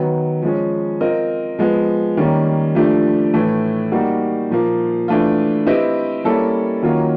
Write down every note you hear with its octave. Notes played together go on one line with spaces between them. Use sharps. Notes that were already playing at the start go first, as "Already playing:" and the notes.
Already playing: D#3 F#3 B3
F3 G#3 C#4
C4 F4 A#4 D#5
F3 G#3 B3
D#3 G3 A#3 C#4
F3 A3 D4 G4
A2 E3 A3
G3 A#3 D#4 F#4
A#2 F3 A#3
E3 A3 D4 F4
C4 E4 G4 B4 D#5
G3 A#3 C#4 E4 A4
D#3 F#3 A#3 C#4 F4